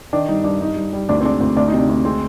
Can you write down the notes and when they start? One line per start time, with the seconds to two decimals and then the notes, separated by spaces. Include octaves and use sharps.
0.13 D#3 D4
0.28 G2 D#4
0.44 G2 D4
0.61 G2 D#4
0.76 G2
0.93 G3
1.09 D2 D4
1.20 C4
1.24 G#3 D4
1.40 D2 C4
1.56 D2 D4
1.68 D#4
1.74 C3 D4
1.89 D2
2.05 G#3 C4